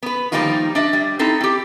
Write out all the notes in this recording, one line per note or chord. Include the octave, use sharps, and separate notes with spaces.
B3 B4
D#3 F3 G3 A#3 D#4 F4
D4 D#5 E5
G3
C4 D#4 E4 A4
C4 G4